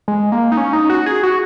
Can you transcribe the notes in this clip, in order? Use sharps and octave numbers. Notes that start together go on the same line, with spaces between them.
G#3
A#3
D#4
C#4
D#4
F#4
G#4
F#4